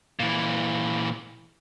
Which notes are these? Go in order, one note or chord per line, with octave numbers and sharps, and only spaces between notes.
A#2 E3